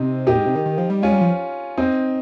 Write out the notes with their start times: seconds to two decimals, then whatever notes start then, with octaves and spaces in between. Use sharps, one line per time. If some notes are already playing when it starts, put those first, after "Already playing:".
Already playing: C3 C4 D#4
0.27 A#2 D#4 G4
0.37 G#2
0.46 C3
0.55 D#3
0.66 D#3
0.78 F3
0.90 G3
1.02 G#3 C#4 F4
1.12 G3
1.21 F3
1.78 C4 D#4